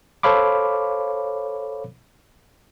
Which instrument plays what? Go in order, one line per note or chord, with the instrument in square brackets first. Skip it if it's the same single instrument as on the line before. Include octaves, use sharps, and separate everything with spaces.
[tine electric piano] A4 C5 C#5 F5 B5 D6